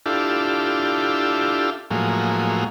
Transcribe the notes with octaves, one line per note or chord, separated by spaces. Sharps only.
D4 E4 F4 G4 A4
A2 F3 F#3 G#3 A#3